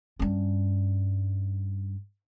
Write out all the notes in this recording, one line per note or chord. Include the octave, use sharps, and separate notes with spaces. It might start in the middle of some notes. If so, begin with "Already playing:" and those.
G2 C#4